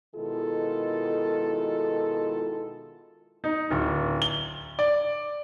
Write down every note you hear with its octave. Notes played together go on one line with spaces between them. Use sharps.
B2 D#3 G#3 E4 F4 A4
D#4
D1
G7
D5